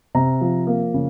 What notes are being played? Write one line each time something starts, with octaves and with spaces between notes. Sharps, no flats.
C3 A#5
F3
A#3
C#3